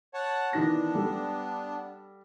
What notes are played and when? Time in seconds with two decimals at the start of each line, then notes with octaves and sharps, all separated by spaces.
0.14 C#5 F#5 A5
0.53 D#3 E3 B3 D4 A#6
0.95 G3 A4